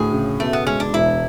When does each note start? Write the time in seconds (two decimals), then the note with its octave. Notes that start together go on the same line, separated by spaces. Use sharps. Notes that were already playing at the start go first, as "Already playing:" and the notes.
Already playing: D2 A2 G#4
0.13 C#3
0.40 B2 A3
0.53 B3
0.67 G#3 C#4
0.80 D4
0.93 E1 E4